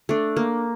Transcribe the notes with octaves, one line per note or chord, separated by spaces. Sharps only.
A3 D4
A#3